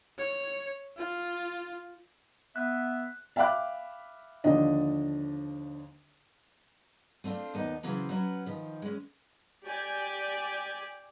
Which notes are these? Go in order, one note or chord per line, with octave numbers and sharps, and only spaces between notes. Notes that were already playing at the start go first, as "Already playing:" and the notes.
C#5
F4
B3 E5 F#6
E5 F5 G5 B5 D6 F#6
D#2 D3 F3 D4 D#5
A3 C4 D4 F4
D#2 B3 D#4
C#3 E3 F#3 C4
F#3 C#4 B4
D#3 F3
G#3 C#4
G4 D5 G#5